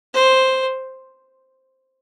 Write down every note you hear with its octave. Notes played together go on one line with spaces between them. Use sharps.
C5